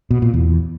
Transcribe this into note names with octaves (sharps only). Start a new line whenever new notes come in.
B2
A#2
E2